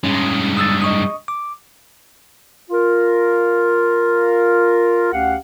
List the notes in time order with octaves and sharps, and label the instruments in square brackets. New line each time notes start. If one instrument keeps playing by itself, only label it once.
[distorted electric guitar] G2 G#3 [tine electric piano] C#4
[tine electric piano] D#6 E6 A6
D#5 C#6 D#6
D6
[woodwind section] F4 A#4
D2 C#4 G4 F5 F#5